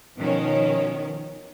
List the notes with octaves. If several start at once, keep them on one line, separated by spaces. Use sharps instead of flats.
B2 D#3 F3 C#4